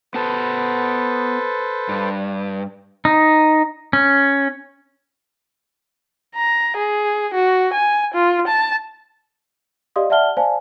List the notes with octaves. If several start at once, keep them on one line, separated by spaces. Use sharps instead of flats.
B3 A4 B4 C5 A5
G2
D#4
C#4
A#5
G#4
F#4
G#5
F4
A5
G4 D5 D#5 F5 C6 D#6
D5 E5 F#5 A5 F6 G7
C5 D5 F5 G#5 A5